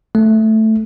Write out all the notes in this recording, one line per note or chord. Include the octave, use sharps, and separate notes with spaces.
A3